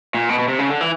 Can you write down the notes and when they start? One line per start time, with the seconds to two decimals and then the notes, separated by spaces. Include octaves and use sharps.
0.15 A#2
0.29 B2
0.39 B2
0.48 C3
0.59 C#3
0.68 D3
0.81 E3